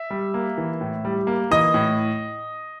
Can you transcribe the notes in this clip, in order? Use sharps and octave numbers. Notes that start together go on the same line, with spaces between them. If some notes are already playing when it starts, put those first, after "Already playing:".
Already playing: E5
G3
A#3
E3
A2
G3
A#3
E3 D#5 D#6
A2